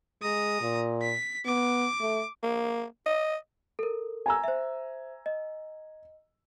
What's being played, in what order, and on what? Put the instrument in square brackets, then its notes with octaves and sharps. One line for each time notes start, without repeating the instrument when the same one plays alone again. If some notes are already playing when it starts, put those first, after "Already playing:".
[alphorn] G#3 [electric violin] A#5 D#6
[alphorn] A#2
[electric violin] B6
[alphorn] B3 [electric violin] D6
[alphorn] A3
[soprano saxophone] A#3
D#5
[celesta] A4 A#4
[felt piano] G#5 A#5 E6
[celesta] C5 E5
D#5